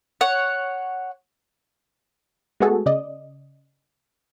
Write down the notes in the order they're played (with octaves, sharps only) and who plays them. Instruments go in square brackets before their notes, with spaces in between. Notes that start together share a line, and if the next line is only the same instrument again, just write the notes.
[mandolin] C#5 F#5
[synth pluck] G#3 A3 B3 F#4 G#4 A4
C#3 D5 D#5